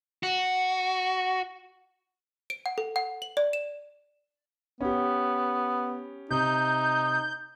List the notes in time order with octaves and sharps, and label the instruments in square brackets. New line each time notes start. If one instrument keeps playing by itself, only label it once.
[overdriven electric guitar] F#4
[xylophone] D7
F#5
A4
F#5
F#7
D5
E7
[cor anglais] B3 [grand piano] C#4 G4
[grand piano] C3 [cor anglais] D#4 [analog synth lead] G6